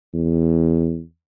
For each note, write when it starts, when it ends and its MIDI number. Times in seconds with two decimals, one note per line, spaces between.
0.14 1.01 40